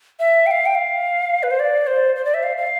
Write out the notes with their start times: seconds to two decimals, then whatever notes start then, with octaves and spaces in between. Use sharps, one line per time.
0.20 E5
0.46 G5
0.51 F5
0.66 G5
0.75 F5
1.43 B4
1.51 C5
1.60 D5
1.87 C5
2.16 C5
2.25 D5
2.34 E5
2.43 F5
2.57 F5